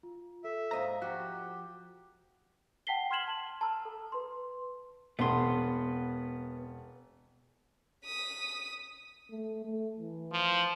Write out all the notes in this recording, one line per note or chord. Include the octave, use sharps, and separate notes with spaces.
F4
A4 E5
G#2 C5 D#5 F5 A#5
F3 F#4 G4 F#6
F#5 G5 A5 B6 C7 G7
F#5 C6 F6 G#6 E7 F#7
A5
A5 A#5 E6 F6
A4
B4 C6
E1 B3 C4 F#5 C6
D#6 B6
A3
A3
E3
F3